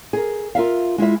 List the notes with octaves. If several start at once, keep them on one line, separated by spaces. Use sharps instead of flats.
G#4 A#4
F4 A#4 E5 F5
G#3 E4 F4 E5